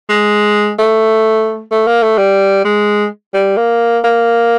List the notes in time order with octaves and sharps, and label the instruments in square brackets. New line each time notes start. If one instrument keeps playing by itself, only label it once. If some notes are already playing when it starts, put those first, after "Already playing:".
[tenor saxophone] G#3
A3
A3
A#3
A3
G3
G#3
G3
A#3
A#3